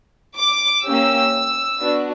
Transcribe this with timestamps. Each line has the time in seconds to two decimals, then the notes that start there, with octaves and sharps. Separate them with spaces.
0.37 D6
0.84 A#3 C#4 G4 E6
1.80 B3 D4 F#4